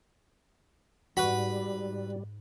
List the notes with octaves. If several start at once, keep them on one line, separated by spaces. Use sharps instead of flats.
G#2 G3 F#4 B4 B5